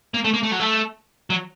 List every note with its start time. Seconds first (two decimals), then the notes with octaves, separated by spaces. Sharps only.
0.14 A#3
0.24 A3
0.34 A#3
0.43 A3
0.51 F#3
0.60 A3
1.30 F#3